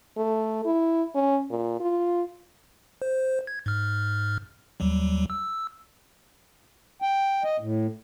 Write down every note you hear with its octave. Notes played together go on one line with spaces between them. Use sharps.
A3
E4
C#4
A#2
F4
C5
G#6
G#2 F6
D#2 F#3 G3
E6
G5
D#5
A2